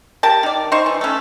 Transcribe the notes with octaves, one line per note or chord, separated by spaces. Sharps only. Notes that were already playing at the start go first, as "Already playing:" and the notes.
G4 A#4 A5
D#3 D5
D#4 C5 C#6
E3
A3 C#4